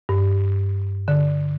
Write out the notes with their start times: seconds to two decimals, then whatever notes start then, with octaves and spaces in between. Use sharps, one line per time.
0.09 G2
1.08 D3